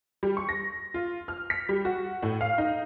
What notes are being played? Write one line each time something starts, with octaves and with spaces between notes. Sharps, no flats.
G3
C#6
A#6
F4
F6
B6
G3
F#4
A2
F5
D#4